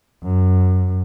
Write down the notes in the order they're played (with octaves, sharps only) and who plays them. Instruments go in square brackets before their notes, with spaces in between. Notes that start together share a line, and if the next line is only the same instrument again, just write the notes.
[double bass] F#2